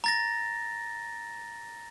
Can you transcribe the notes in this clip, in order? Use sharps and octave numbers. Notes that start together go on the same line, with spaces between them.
A#5 A6 A#6